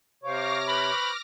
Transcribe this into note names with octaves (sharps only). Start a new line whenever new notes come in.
C3 C5 C#5 F5 C#6 D6 F6 A#6
B4 C5 B5 C#6